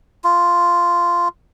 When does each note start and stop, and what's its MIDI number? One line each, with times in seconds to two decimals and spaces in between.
0.24 1.28 65